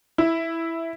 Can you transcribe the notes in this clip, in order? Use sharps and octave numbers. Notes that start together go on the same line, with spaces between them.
E4